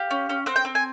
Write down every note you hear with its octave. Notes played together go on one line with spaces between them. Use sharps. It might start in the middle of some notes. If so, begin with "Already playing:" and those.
Already playing: G4 F5
C#4
C#4
C4 F#5
G5
C4
G#5